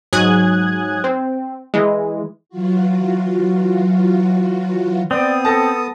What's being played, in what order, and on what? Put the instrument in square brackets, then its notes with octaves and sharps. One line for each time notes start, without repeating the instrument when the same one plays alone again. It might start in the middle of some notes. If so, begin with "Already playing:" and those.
[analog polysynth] G#2 F#3 G#5 D#6 F#6 G#6
C4
E3 G#3
[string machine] E3 F#3 F4 F#4
[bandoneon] B3 D#6 [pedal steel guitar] C4 [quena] D5
[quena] A4 [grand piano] A5 A#6